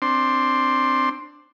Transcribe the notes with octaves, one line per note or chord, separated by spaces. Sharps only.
C4 D4 C6